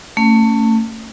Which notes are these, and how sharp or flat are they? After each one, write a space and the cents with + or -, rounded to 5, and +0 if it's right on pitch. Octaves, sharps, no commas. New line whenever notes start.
A3 +25 C#4 +0